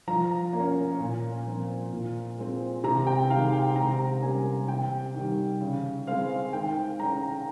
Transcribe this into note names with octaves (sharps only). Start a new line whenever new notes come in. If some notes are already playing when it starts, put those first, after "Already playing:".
F3 A#5
A#3
C#4
A#2
F3 C4
A#2
G#3 C4
C3 A#5
G5
D#3 G#3 F5
G5
C3 A#5
G3 A#3 C#4 G#5
C3 G5
D#3 G3
C#3
G#3 C4 F5
D#3 G5
G#3 C#4 A#5